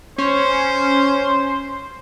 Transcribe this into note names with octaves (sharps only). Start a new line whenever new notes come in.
C#4 C5